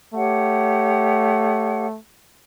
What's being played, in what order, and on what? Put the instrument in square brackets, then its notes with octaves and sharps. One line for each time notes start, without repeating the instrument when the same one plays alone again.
[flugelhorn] A3 [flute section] G4 C#5 F#5